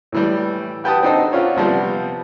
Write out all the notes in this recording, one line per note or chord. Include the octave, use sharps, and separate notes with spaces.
A2 E3 G3
F#4 G4 B4 A5 D#6
C4 D4 D#4 F#4 A4 C5
C#4 F4 F#4 C5 D5
C3 F3 G3 B3